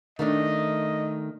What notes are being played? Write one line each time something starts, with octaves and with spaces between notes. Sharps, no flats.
D#3 A3 D4 D#5